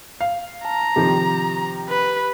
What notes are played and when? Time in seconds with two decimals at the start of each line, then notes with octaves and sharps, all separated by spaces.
0.21 F5
0.65 A5 A#5
0.96 C3 D#3 F3 G4
1.89 B4